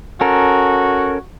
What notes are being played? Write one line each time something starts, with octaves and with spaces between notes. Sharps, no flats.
C#4 F#4 A4 A#4